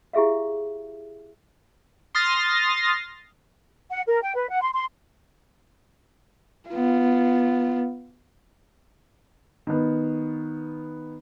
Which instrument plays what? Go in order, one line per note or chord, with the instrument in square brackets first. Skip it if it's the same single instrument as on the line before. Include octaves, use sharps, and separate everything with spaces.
[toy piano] E4 G4 G#4 E5 F5
[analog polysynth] C6 D#6 F6 A6 A#6 C7
[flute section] F#5
A#4
G5
B4
F#5
C6
C6
[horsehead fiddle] B3 F4
[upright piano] D#3 B3